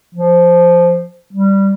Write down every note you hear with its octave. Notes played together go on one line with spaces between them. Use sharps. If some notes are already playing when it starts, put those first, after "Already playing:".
F3
G3